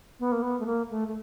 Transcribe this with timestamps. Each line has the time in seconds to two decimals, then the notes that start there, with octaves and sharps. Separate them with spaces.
0.20 B3
0.32 A#3
0.42 B3
0.60 A3
0.66 A#3
0.90 A3
1.08 A3